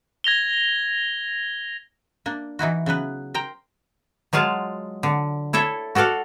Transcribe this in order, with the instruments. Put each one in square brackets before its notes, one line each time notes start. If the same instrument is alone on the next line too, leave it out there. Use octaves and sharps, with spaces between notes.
[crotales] G#6 A#6 F7 G7
[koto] A#3 D4
E3 D#4 E4 F#4
C#3 F#3 B3 B4
A#4 C5 G5 A#5
F#3 G#3 F4 F5 A5
D3
E4 A4 C#5 E5
F#4 A4 D5 F5 F#5